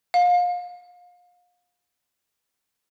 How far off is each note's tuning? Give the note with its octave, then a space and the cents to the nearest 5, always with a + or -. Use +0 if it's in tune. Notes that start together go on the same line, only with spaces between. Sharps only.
F5 +30